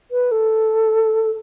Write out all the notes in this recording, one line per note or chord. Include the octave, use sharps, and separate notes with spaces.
B4
A4